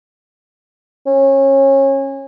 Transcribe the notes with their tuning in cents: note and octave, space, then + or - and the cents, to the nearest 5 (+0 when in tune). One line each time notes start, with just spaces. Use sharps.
C#4 -25